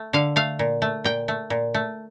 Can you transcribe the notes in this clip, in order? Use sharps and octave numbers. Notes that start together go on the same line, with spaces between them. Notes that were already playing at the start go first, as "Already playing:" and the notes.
Already playing: A3
D3 F5
A3 F5
A#2
A3
A#2 G5
A3
A#2
A3